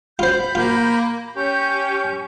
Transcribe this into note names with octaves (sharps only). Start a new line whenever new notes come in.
F4 C5 B5 G6
A#3 F4
C#4 G4 G6